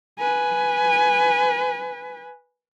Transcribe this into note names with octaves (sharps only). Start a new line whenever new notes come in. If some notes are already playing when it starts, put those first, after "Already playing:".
B4 G#5